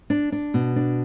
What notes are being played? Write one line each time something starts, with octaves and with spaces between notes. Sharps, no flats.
D4
D4
B2
D4